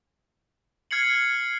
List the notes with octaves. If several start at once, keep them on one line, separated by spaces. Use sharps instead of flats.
F6 G#6 C7 C#7 F#7